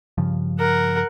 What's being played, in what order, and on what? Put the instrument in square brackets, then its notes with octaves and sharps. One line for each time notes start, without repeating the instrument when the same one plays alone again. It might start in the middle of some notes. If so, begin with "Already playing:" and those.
[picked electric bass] G2 C#3 F3
[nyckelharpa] A#4 F#5